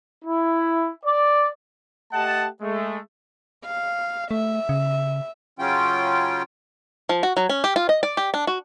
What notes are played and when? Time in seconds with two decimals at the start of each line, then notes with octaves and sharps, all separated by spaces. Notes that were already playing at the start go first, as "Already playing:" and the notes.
0.24 E4
1.05 D5
2.12 A3 G4 D#5 F#5 A5
2.61 G#3 A3
3.65 F5
4.31 A3 E5
4.69 C#3
5.59 C#3 F#3 C#4 F4 G5
7.09 F3
7.23 F#4
7.37 F#3
7.49 C#4
7.64 G4
7.76 F4
7.89 D#5
8.03 D5
8.17 G4
8.34 D4
8.47 F#4